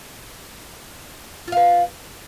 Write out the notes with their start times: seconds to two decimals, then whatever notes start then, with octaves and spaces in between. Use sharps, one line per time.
1.48 F4
1.52 F5
1.57 B4